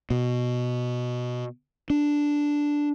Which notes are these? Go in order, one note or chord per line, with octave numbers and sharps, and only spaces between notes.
B2
D4